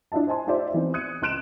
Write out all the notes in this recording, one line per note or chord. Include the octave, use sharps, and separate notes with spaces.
D4 E4 F4 D#5 A5
C5 D#5 G#5 A5 C6
D#4 F4 G4 C5 D5 E5
E3 B3 C4 D#4
D#6 F#6 G#6 C#7 D#7
C#2 C6 F#6 D7 E7